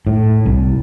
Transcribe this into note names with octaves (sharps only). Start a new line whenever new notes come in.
A2
C2